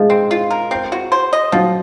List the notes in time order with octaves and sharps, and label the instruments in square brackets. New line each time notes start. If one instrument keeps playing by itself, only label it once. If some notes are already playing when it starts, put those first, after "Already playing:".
Already playing: [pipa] F3 [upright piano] G#3
[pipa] C4
F4
A#4
C4
F#4
C5
D#5
[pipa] F3 [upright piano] F#3